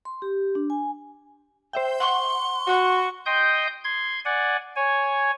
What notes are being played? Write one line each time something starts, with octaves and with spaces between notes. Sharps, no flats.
C6
G4
D4
G#5
C5 E5 G5
F#5 C6 C#6 G7
F#4
D#5 G5 C6 D#6 G6
C6 G#6
D5 F#5 G#5
C#5 G#5